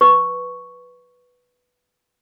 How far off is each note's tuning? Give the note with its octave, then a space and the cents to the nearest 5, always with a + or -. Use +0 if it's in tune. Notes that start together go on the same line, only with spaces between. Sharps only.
B4 +0 C#6 +0